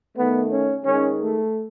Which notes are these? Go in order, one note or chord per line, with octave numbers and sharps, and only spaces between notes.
D#3 A3 B3
C#4
D#3 G#3 C#4
A3